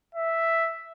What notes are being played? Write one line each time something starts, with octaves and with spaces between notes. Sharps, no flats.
E5